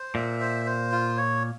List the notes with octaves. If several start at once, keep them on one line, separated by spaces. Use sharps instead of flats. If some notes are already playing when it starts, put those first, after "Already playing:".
Already playing: C5
A#2 E5
C5
C5
F4
C#5